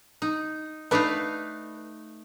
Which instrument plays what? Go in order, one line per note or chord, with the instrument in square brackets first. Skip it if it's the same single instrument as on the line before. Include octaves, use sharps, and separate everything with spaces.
[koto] D#4
[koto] A3 D#4 F5 [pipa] D4 B4